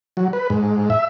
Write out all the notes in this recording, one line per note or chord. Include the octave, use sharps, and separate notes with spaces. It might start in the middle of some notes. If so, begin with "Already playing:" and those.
F#3
B4
G#2
E5